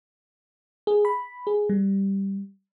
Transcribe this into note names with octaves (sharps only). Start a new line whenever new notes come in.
G#4
B5
G#4
G3